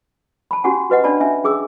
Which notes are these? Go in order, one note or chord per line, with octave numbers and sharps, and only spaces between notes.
A5 B5
C#4 F#4 G4 F#5 G#5
F#4 B4 D#5 F#5
C#4 D4 C#5 D5 A5 B5
C#4 E5 G#5
C#4 G#4 D6 E6